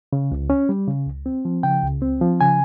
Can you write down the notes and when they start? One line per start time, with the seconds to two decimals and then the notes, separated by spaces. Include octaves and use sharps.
0.13 C#3
0.32 C#2
0.50 C#4
0.69 G3
0.88 C#3
1.07 C#2
1.26 C4
1.45 F3
1.63 C#3 G5
1.83 C#2
2.02 C4
2.21 F3
2.41 C#3 G#5